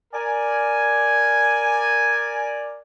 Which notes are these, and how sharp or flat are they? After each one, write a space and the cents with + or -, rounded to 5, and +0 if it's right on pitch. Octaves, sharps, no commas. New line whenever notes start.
A#4 +0 D5 +0 G#5 +0